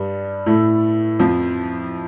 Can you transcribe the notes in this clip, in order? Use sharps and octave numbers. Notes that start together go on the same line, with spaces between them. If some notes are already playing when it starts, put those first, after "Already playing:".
Already playing: G2 G3
A2 A3
F2 F3